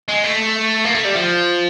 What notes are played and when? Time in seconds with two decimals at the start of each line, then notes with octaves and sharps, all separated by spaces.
0.09 G#3
0.24 A3
0.85 A#3
0.94 A3
1.04 G3
1.15 F3